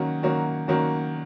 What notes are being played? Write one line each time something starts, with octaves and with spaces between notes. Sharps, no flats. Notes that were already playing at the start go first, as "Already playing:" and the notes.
Already playing: D#3 F#3 A#3 C#4 F#4
D#3 F#3 A#3 C#4 F#4
D#3 F#3 A#3 C#4 F#4